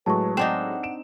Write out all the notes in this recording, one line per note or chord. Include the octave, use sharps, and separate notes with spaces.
A2 F#3 G#3 B4 A5 C#6
C4 D4 D#4 F#5 E7
D7 E7